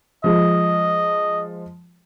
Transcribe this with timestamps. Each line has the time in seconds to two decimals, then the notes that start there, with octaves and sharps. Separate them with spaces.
0.24 F3 G#3 D#5